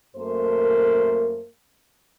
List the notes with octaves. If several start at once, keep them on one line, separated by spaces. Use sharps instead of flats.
F#2 A3 A#3 A#4 C5